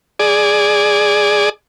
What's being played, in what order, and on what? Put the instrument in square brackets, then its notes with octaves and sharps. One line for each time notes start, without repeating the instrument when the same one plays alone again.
[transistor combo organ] G#4 D5